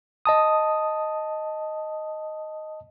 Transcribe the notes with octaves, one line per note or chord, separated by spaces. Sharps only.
D#5 A5 D#6